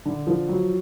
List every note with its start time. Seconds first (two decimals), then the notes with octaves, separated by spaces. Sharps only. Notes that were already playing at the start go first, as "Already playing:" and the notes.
0.05 D3
0.27 F3
0.48 F#3